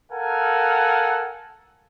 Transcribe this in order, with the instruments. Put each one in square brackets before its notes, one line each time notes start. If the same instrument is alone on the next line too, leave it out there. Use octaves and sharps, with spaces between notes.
[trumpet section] A4 A#4 F5 F#5 G#5